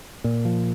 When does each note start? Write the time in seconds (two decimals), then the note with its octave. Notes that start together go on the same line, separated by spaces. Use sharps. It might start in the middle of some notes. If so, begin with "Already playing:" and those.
0.24 A#2
0.45 F3